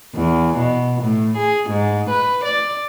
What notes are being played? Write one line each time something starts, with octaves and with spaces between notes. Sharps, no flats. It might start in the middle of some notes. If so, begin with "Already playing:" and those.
E2
B2
A2
G#4
G#2
B4
D5